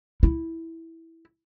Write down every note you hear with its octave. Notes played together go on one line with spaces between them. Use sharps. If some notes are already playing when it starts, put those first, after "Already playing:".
E4